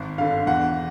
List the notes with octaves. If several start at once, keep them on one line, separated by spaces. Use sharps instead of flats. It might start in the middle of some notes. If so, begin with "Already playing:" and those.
Already playing: G#1
G2 D3 F5
E2 F#5